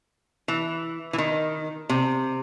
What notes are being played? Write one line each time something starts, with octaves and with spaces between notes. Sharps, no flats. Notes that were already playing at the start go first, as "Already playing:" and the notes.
E3
E3
D#3
C3